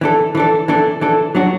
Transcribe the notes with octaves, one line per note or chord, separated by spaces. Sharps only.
E3 D4 A4
E3 D4 A4
E3 D4 A4
E3 D4 A4
F#3 D4 F#4